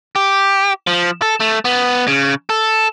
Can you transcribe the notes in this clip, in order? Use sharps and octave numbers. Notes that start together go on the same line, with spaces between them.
G4
F3
A4
A3
B3
C#3
A4